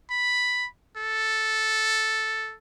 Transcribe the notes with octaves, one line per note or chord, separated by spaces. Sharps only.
B5
A4